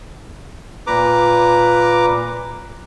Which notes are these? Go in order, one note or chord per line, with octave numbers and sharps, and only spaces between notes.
A#2 B4 A#5 D6